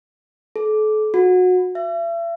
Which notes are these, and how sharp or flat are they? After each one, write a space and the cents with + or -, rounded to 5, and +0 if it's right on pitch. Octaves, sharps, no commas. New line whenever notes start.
A4 -40
F#4 -20
E5 +40